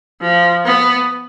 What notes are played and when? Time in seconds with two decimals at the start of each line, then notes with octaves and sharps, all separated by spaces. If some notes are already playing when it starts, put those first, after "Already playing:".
0.21 F3
0.65 B3